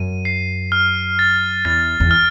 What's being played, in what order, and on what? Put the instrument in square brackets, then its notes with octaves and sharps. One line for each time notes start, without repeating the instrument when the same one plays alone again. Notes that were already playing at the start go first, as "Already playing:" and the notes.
Already playing: [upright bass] F#2 [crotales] D#7
[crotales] C7
F6
A6
[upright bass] E2 [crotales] A6
[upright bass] E2
[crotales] F6